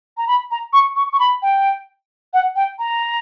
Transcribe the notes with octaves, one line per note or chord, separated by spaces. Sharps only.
A#5
B5
A#5
C#6
C#6
C#6
B5
G5
F#5
G5
A#5